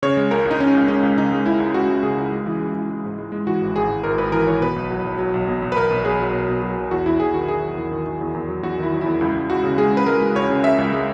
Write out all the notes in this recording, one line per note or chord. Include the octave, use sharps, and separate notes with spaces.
C#3 C#5
G#3
C#2 A#4
C#2
D#4
C#2 C#4
C#2
G#3 C#4
C#2
C#3 D#4
G#3
C#2 E4
C#2
C#2 F#4
C#2
C#3 G#4
C#2
G#3
E3
G#3
E3
G#3
G#2
G#3
G#3
E3 F#4
G#1
G#1 G#4
G#1
G#1 A#4
G#1 B4
E3 A#4
E3 C#5
B2 B4
B1
F#3
B1
F#3
B1
B2
B1
B4
B1 A#4
B1
B1 G#4
F#3
B2
B2
F#3
B1
E2 F#4
E2 E4
E2 G#4
D#3 F#4
D#3 G#4
F#3
E2
D#3
D#3
E2
E2
F#3
E2 F#4
D#3 E4
F#3
E2 E4
C#2 E4
C#2
C#2 F#4
C#3
G#3 G#4
C#3 B4
G#3 A#4
G#3
C#2 C#5
C#3
C#3 E5
C#2
G#3